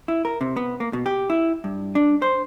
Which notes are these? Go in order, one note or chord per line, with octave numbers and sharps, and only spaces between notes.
E4
A#4
C3
B3
A#3
B2
G4
E4
G2
D4
C5